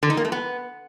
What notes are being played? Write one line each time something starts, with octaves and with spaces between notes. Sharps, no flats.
D3
D#4
A#3
A3
B3